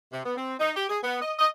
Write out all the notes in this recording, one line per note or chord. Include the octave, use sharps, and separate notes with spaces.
C3
B3
C4
D#4
G4
G#4
B3
D#5
D#5